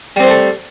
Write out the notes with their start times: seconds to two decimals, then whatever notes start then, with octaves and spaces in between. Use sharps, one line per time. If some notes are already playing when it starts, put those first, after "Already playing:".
0.16 G3
0.20 C4
0.23 C5
0.27 A3
0.30 A4